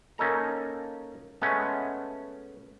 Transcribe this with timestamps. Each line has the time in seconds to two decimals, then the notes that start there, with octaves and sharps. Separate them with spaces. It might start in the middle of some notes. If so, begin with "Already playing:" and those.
0.18 A#3 C#4 D#4 A4 A#5
1.42 G#3 A3 B3 C#4